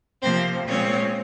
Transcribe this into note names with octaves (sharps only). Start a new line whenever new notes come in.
C3 F3 A#3 C4 C5
A#2 G#3 C4 C#4 C#5